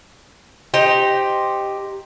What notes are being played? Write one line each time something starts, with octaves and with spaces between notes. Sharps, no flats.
D#4 G4 C5